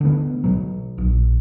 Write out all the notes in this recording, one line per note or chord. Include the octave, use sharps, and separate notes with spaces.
D3 A3 B3
B2 F#3
A#1